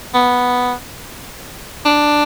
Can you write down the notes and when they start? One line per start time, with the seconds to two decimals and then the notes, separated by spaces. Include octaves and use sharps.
0.14 B3
1.85 D4